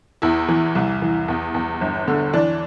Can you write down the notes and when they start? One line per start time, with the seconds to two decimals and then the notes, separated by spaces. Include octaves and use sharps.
0.22 E2 E4
0.48 E3
0.75 C2
1.02 E3
1.28 E2
1.54 E2
1.81 G1
2.08 D3
2.33 E3 D4